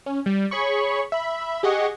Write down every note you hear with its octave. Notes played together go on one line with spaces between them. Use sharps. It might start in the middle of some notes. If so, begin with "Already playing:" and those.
C#4
G3
G#4 C#5 B5 C#6
E5 B5
G4 G#4 D#5 F#5 C#6